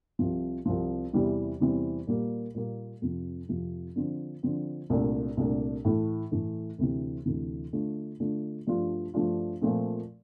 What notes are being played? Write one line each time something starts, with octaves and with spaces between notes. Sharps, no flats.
C2 C3 F3
C2 C3 F3
E2 C3 E3 G3 C4
E2 C3 E3 G3 C4
A#2 G3 A#3
A#2 G3 A#3
F2 C3 F3
F2 C3 F3
D3 F3 C4
D3 F3 C4
C2 A#2 A3 D4
C2 A#2 A3 D4
A2 E3 A3
A2 E3 A3
D2 C3 E3
D2 C3 E3
D3 A3 D4 F4
D3 A3 D4 F4
G2 F3 A3 D4 F4
G2 F3 A3 D4 F4
A#2 F3 A3 C4